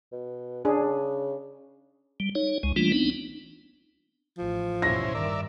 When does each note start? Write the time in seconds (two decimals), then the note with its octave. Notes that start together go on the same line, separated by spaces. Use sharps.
0.12 B2
0.65 C#3 D4 G#4
2.20 G3
2.35 D#4 C#5
2.63 C#2 G#3
2.76 E3 G3 A3 A#3 D4 F4
2.92 B3 C4 D4 D#4
4.38 A1 F3
4.82 D#2 G#2 B2 C#4 E4 C5 A#6
5.15 G2 D#3 A#4 D5 E5